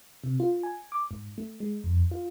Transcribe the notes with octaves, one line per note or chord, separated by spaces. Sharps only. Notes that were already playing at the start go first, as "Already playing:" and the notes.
C3
F4
G#5
D6
G#2
A3
G#3
F2
F4